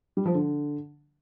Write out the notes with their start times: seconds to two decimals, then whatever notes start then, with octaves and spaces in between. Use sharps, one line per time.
0.17 G3
0.26 F3
0.34 D3